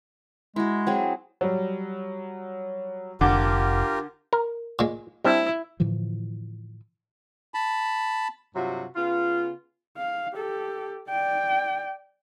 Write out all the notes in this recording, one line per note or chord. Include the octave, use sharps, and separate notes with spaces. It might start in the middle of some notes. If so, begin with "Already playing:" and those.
G#3 E4 F#4
F#3 C4 G#4
F#3 G3
F1 D3 F4 G4 A#4 D6
A#4
A#2 G#3
G3 C4 D4 E4
A2 D3 E3 F3
A5 B5
G2 C3 F#3 F4 F#4
C#3 B3 F4
F5
G4 A4
D5 G5